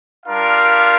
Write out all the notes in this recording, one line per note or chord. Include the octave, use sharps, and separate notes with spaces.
G3 D4 F4 A#4 F5